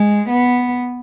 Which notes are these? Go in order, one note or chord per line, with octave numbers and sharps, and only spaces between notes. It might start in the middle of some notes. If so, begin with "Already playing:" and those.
Already playing: G#3
B3